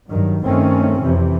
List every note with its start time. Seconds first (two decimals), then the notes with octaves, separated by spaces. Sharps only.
0.11 G2 D#3 F#3
0.44 G2 D#3 A3 C4 C#4
1.02 F2 C3 E3